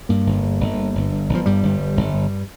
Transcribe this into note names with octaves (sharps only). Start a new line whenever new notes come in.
G2 A#3
G1
G2
G1
G2
G1
G2
G1
F3
G2 G3
G1
G2
G1
G2